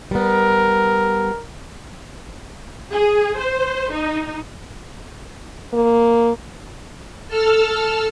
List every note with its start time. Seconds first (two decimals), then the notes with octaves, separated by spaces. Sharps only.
0.11 G3 B3 A#4
2.93 G#4
3.38 C5
3.92 D#4
5.74 A#3
7.28 A4 A5 E6 F6